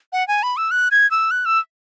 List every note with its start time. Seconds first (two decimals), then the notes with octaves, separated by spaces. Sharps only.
0.13 F#5
0.28 G#5
0.43 B5
0.57 E6
0.71 F#6
0.91 G#6
1.11 E6
1.31 F#6
1.46 E6